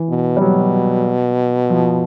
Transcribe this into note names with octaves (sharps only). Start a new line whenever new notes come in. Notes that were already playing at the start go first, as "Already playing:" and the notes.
Already playing: E3
B2
G3
B2 F#3
F3